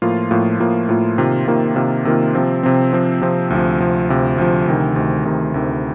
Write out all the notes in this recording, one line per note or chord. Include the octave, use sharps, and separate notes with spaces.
A2 F3 A#3 F4
A2 F3 A#3 F4
A2 F3 A#3 F4
A2 F3 A#3 F4
C3 D#3 A#3 F4
C3 D#3 A#3 F4
C3 D#3 A#3 F4
C3 D#3 A#3 F4
C3 F3 C4
C3 F3 C4
C3 F3 C4
C3 F3 C4
D2 C3 F3
D2 C3 F3
D2 C3 F3
D2 C3 F3
D2 C3 D#3
D2 C3 D#3
D2 C3 D#3
D2 C3 D#3